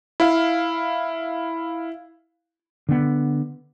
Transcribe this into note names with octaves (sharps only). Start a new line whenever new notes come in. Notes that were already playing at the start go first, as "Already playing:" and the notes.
E4 F5
D3 B3